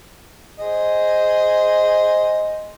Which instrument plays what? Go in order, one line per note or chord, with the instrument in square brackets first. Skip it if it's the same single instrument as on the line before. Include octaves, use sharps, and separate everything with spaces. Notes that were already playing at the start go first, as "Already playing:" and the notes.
[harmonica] G#4 C5 D#5